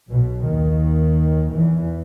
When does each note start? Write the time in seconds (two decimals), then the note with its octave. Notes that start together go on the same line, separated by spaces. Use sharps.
0.10 B1 B2
0.46 D#2 D#3
1.54 E2 E3